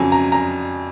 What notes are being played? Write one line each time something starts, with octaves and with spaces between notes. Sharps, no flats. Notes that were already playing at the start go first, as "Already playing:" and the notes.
Already playing: F2 C#3 F#3 G#5
A#5
A#5